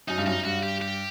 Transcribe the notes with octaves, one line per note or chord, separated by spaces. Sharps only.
F#2 D#4
G2
F#2 D#4
G2 F#4
G4
G4